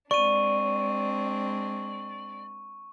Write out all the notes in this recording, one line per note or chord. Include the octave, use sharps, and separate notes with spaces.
G#3 C4 D4 D5 C#6 D#7